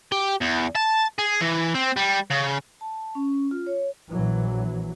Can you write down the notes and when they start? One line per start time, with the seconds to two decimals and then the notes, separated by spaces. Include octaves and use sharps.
0.12 G4
0.41 E2
0.76 A5
1.19 G#4
1.41 E3
1.74 C4
1.96 G3
2.30 C#3
2.81 A5
3.15 C#4
3.51 F4
3.67 C#5
4.11 A#1 E3 F#3